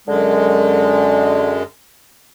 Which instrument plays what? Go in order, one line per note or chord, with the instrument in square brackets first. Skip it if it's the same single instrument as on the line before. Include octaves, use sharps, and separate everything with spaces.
[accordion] F#2 G#3 [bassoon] D3